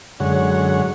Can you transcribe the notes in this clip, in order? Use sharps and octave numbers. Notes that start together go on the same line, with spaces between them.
F#2 D3 G#3 C#5 F#5